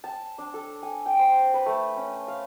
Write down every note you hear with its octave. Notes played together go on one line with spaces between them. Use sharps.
A5
D4
A4
G#5
G5
C5
B4
A3
C#4
F5